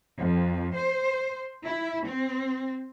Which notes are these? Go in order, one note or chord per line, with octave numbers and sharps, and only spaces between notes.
F2
C5
E4
C4